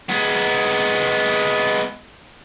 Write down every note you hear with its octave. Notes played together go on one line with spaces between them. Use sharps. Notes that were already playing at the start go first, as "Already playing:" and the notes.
G#3 B3